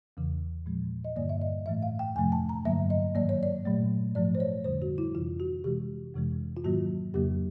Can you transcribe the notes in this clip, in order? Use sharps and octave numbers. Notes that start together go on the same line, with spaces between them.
E2 C#3 E3
A#2 F3 G#3
D#5
G2 D3 G3 A#3 D5
E5
D#5
A2 E3 A3 E5
F5
G5
F2 C3 F3 A3 G#5
A5
A#5
G2 D3 F#3 A#3 E5
D#5
G#2 D#3 F#3 A#3 D5
C#5
D5
A#2 F#3 A3
G#2 F3 A3 D5
C5
C#5
F2 D3 G3 C5
F#4
E4
F2 C3 E3 F4
F#4
C3 E3 G#3 G4
F2 C3 E3 G#3
F4
G#2 D#3 F#3 A#3 F#4
F2 C#3 F#3 A#3 G4